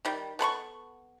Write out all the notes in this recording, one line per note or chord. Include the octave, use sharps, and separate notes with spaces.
D#3 G3
B3 A4 B5 C#6